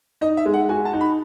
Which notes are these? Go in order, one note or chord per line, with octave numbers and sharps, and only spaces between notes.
D#4 D#5
E5
G#3
F#5
F#4 G#5
A5
D#4
B5